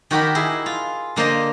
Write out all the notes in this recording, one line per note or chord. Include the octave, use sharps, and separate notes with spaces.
D#3 F#4 G4 A#4 B5
E4 G#4
F4
D3 A#3 C5 D#5 A#5